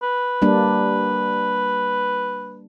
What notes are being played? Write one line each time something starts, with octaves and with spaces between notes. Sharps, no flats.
B4
G3 A#3 D4